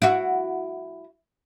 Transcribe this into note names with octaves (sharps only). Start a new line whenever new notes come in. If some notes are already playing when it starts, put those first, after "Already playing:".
E4 F#4